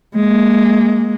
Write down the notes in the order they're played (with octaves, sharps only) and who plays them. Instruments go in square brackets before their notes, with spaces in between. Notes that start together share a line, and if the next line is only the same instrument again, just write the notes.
[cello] G#3 A#3